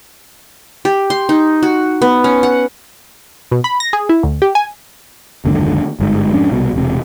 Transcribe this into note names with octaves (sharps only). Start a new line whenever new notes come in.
G4
C6
D#4
F#4
B3
C#4
F#5
B2
B5
A#6
G#4
E4
D2
G4
G#5
F#1 D#2 G#2 D3
G1 G#2
F2 G#2 C#4 D4
C2 B2
E1 C3